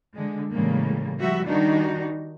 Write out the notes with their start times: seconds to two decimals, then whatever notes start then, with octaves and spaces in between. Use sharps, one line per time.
0.14 D3 G#3
0.52 A2 C#3 E3 G3 G#3 A#3
1.17 F3 G3 F#4 E5
1.47 D#3 G3 D4 D#4 F#4